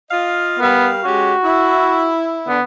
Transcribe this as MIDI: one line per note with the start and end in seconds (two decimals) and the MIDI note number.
0.11 0.57 65
0.11 0.57 75
0.11 0.57 77
0.59 1.01 55
0.59 0.89 59
0.59 1.01 70
0.59 1.01 77
1.04 1.33 56
1.04 1.33 61
1.04 2.11 66
1.04 1.33 67
1.44 2.43 64
2.48 2.58 50
2.48 2.63 59